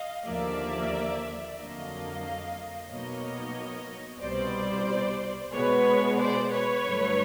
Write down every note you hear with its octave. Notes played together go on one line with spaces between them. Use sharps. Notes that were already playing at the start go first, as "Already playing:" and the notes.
Already playing: D#5 F5
D#2 D3 F3 A#3 D5 E5
F2 D3 F#3 A#3 D#5 F5
B2 F#3 A#3 D#4 C#5 D#5
C2 B2 G3 C5 D5
B2 G#3 B3 B4 C#5
C5 D5
B4 C#5
G2 D3 F#3 A3